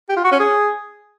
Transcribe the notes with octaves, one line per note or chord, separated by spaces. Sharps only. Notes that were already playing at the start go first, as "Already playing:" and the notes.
G4
F4
F#4
C#4
G#4